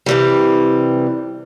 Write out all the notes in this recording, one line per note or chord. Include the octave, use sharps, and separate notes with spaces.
C3 E3 G3